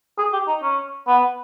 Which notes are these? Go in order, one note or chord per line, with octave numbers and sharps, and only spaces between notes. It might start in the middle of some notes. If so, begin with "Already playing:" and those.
G#4
G4
D#4
C#4
B3